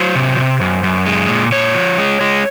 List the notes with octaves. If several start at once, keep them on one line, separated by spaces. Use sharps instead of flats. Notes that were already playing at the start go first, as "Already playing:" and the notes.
Already playing: F#3 C5
C3
C3
F#2
F#2
G#3
A#2
A#2 C#5
F3
G#3
G#3